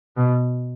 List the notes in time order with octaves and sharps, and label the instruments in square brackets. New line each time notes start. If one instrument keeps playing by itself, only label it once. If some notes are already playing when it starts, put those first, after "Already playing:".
[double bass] B2